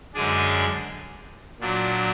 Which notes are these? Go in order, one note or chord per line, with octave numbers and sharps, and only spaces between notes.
F#2 D3 G#3 D4 G#4
A#2 F#3 D4